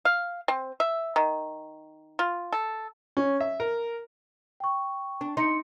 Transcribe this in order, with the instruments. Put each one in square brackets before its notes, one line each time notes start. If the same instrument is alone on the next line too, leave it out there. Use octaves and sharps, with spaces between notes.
[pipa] F5
C4
E5
D#3
F4
A4
[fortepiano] C#4
E5
A#4
[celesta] G5 C#6
[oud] D4
[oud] D#4 [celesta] C6 C#7